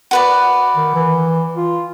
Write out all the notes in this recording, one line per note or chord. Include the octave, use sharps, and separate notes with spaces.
F#4 B4 D5
D#3
E3
F4